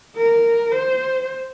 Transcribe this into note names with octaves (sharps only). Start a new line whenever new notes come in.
A#4
C5